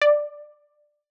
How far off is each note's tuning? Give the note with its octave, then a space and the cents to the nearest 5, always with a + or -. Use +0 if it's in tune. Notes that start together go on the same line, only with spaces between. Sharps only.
D5 +10